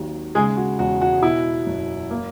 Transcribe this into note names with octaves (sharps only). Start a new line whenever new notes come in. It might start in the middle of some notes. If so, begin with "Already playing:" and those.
Already playing: G#1 D#2 F#3
C#3 G#3 G#4
F#4
E1 F#4
F#4
B2 E4
F#1
A#3